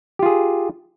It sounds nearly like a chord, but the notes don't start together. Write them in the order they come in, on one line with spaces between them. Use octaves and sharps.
G4 F4 G#4